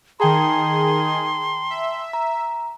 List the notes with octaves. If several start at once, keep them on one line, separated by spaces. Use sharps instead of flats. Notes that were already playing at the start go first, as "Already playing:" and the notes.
D#3 G#4 G5 A5 A#5 C6
E5
A#5